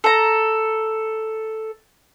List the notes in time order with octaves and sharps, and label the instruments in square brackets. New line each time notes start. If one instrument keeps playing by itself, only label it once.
[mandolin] A4 A#5